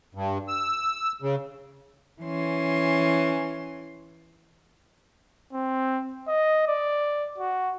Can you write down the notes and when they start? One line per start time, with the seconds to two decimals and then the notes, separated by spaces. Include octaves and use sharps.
0.15 G2
0.48 E6
1.22 C#3
2.23 E3 C#4 C6
5.53 C4
6.28 D#5
6.67 D5
7.38 F#4